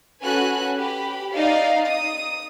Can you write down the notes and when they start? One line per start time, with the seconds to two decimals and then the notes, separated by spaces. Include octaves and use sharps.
0.23 C#4 F#4 A4 B4 G#5 F#6
0.78 G4 B5
1.35 D#4 D5 D#5 F5
1.87 D#6